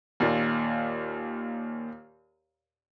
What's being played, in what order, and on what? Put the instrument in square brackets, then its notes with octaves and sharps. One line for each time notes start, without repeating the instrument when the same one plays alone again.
[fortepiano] D#2 A#2